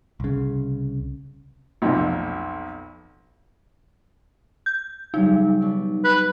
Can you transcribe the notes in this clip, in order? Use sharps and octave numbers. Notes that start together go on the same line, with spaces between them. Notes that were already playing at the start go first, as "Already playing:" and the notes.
C2 C#3
B1 F2
G6
C#3 F#3 G3 D#4
B2 D5
B4